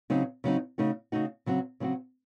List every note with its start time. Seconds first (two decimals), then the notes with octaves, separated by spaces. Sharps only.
0.10 C#3 F#3 C4 D#4
0.44 C#3 F#3 C4 D#4
0.78 C#3 A3 D#4 F#4
1.12 C#3 A3 D#4 F#4
1.46 C#3 F#3 C4 F#4
1.80 C#3 F#3 C4 F#4